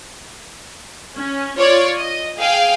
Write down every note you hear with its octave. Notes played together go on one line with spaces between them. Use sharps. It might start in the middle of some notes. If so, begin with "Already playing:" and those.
C#4
F4 C#5 D5
D#5
G#4 F5 G5